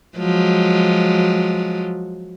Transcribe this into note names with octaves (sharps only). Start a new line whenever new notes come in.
F3 F#3 G#3